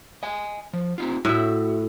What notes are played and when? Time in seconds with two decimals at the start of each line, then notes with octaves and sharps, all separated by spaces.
0.23 D#5 G#5
0.73 F3
0.98 C4 D#4 F4
1.25 A2 F#4 E5